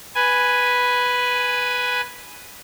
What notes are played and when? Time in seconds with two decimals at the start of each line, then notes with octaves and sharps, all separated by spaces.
0.15 B4 G#5